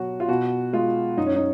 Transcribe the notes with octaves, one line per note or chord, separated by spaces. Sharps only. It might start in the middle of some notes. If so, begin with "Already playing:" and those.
Already playing: B2 F#3 F#4
F4
B2 F#4
G#3 F4
F#2 D#4
C#4
D#4